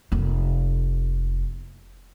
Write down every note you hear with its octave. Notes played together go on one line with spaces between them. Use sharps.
F1 A#3